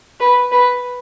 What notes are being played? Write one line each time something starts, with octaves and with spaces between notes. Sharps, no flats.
B4
B4